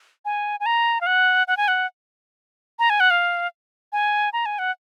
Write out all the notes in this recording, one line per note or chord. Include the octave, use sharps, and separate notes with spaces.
G#5
G#5
A#5
F5
F#5
F#5
G#5
F#5
A#5
G#5
F#5
F5
G#5
A#5
G#5
F#5